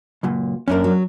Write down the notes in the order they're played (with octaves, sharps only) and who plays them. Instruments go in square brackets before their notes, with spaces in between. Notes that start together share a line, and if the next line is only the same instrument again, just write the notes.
[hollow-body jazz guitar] C#2 F#2 A#2
[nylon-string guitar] F#2 A#3 [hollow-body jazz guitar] C#4 D4 A#4
[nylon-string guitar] F#3